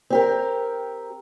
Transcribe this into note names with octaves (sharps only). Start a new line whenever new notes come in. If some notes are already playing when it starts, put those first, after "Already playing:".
C4 G4 A#4